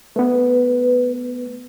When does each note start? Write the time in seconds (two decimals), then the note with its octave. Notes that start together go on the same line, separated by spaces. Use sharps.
0.16 A3 B3 B4